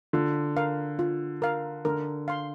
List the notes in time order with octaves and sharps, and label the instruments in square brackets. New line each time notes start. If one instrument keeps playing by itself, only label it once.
[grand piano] D3 [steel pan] F4
[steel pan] A#4 F5
F4
A#4 F5
[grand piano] D3 [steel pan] A#4
[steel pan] F5 C6